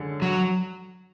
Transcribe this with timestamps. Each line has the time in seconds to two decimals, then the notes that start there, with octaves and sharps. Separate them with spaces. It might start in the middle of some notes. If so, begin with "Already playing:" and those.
Already playing: F#2 D3 G#3
0.22 F#3